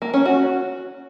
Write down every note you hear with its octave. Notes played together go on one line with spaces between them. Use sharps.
A#3
C#4
F#4